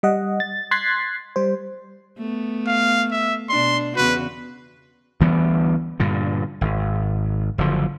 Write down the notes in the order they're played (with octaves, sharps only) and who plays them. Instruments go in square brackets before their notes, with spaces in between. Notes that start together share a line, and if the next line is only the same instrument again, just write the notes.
[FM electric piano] G3 D#5 F#5
A6
C6 F#6 G#6 A6 B6 C7
G3 C5
[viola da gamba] A3 B3
[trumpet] F5
E5
[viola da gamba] B2 D4 [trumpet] C6
[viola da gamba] E2 C#3 F#4 [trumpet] B4
[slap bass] D2 E3 G3 B3
G2 A#2 D3
G#1
F#1 D3 F3